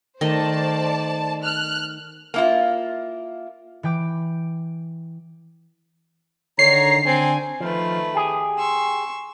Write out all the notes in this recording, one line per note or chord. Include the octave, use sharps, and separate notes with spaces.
D#3 A3 C5 D5 D#5 A5
F6 F#6
A#3 E4 F4
E3 G5 D6
D3 D#3 C#5 A#5 C7
D3 C4 G#5
D#3 F3 A3 B4
G4 G#4
C6 C#6 E6